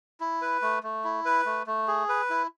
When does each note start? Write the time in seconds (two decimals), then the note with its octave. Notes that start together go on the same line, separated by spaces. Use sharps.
0.20 E4
0.42 B4
0.62 A3
0.83 A3
1.04 E4
1.25 B4
1.46 A3
1.67 A3
1.88 G#4
2.09 B4
2.30 E4